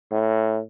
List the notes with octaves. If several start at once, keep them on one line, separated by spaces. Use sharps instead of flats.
A2